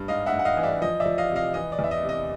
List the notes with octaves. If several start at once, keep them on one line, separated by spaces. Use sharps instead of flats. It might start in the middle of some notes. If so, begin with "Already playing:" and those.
Already playing: G2
G#2 D#5 F5
E5 F#5
G#2
F#5
D#5 F5
E3
D5 E5
F3 D#5
D5 E5
F3
D#5 F5
C3
D#5 F5
E3 D#5
D5
E2 E5
D#5
C3
D#5